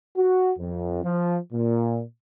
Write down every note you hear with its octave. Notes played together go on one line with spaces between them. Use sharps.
F#4
F2
F3
A#2